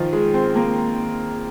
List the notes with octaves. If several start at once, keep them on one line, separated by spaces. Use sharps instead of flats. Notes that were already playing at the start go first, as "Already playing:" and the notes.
Already playing: D#3 F3
G#3
C4
A#3